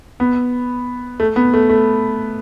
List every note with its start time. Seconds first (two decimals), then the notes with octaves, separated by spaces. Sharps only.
0.20 B3
1.20 A3
1.36 B3
1.54 A3
1.69 A3